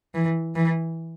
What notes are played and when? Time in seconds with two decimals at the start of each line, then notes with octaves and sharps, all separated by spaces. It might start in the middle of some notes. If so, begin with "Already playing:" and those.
0.15 E3
0.55 E3